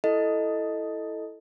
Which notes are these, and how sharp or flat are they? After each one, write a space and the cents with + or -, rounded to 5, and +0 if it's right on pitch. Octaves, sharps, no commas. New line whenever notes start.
E4 +0 A4 +0 D#5 +0